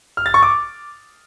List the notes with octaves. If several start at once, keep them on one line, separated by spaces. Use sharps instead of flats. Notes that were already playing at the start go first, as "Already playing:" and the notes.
F6
A6
C#6
D6